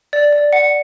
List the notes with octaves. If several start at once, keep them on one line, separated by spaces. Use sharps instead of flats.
D5
D5
F#5